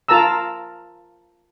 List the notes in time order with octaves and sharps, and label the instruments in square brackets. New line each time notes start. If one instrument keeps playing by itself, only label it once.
[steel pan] F4 A#4 A5 A#5 E6